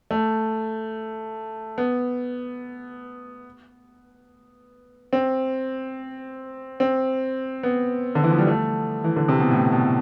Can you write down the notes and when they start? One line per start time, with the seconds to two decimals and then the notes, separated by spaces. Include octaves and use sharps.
0.11 A3
1.78 B3
5.13 C4
6.80 C4
7.63 B3
8.15 D3
8.23 E3
8.31 F3
8.39 G3
8.47 A3
9.04 E3
9.16 D3
9.28 C3
9.40 B2
9.51 A2
9.72 B2